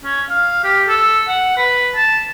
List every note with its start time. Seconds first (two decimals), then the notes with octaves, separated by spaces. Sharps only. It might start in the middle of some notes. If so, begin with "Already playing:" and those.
0.04 C#4
0.30 F5
0.64 G4
0.89 A4
1.28 F#5
1.57 B4
1.96 A5